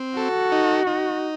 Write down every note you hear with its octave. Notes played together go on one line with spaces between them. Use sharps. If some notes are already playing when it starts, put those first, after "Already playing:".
Already playing: C4
F#4 A4
D#4
D#4